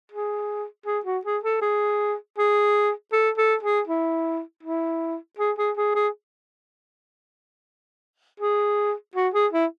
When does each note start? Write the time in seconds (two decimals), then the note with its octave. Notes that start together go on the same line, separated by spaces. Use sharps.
0.12 G#4
0.86 G#4
1.06 F#4
1.25 G#4
1.44 A4
1.62 G#4
2.38 G#4
3.12 A4
3.38 A4
3.63 G#4
3.88 E4
4.63 E4
5.39 G#4
5.58 G#4
5.77 G#4
5.95 G#4
8.40 G#4
9.16 F#4
9.34 G#4
9.53 E4